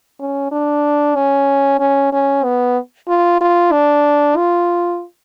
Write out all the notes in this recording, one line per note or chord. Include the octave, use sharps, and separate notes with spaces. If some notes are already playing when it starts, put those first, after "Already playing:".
C#4
D4
C#4
C#4
C#4
B3
F4
F4
D4
F4